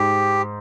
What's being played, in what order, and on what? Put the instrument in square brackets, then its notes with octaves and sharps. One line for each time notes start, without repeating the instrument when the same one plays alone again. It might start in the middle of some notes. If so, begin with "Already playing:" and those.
Already playing: [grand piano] G#2 [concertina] G4